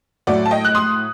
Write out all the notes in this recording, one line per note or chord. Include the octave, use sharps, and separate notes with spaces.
A2 F#3 A3 D5 F#5
A5
D#5 G5
F#6
C6 D#6